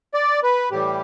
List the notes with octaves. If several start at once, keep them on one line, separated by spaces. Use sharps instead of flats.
D5
B4
A2 E3 G3 G4